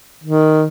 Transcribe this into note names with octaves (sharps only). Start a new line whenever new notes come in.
D#3